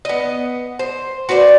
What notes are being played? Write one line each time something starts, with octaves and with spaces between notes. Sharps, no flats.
B3 D#5
C5
F#4 B4 C5 D5